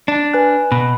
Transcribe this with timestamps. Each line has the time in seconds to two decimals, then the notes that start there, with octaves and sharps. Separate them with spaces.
0.08 D4
0.33 B4 G#5 F#6
0.72 B2 B5